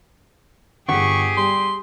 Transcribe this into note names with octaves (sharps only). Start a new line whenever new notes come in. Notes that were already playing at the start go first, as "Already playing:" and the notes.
G1 G4 G#4 F#5 C#6 B6
G3 C6